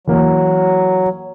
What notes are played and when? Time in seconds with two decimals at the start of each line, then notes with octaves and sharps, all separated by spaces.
0.07 E3 F#3 A#3